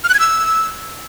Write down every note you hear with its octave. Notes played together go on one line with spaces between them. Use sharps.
F6
F#6
G#6
E6